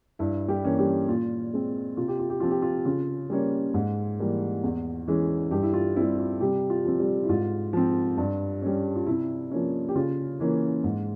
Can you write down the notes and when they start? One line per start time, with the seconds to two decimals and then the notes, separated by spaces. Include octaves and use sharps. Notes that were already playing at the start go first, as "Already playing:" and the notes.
0.19 G2 E4
0.48 G3 G4
0.64 E3 A#3 C#4
0.78 G3 G4
1.08 A#2 F4
1.53 G#3 C4
1.97 C3 F4
2.08 G4
2.19 F4
2.30 G4
2.40 F3 C4 F4
2.51 G4
2.62 F4
2.85 C#3 F4
3.30 G3 A#3 C#4
3.74 G#2
4.19 E3 G3 A#3
4.64 E2
5.08 E3 G#3 C#4
5.51 G2 G3 G4
5.63 E4
5.74 F4
5.96 G3 C4 E4
6.18 F4
6.40 C3 G3 G4
6.70 F4
6.84 F3 C4
6.99 G3 G4
7.24 E4
7.29 G#2 F4
7.73 F3 C4
8.17 G2
8.62 G3 C#4
8.96 F4
9.07 C3 E4
9.51 F3 A#3 C#4
9.89 G4
9.95 C#3 F4
10.40 E3 A#3 C#4
10.84 G#2